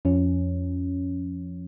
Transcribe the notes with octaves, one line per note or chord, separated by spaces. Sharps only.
F2 F3 C#4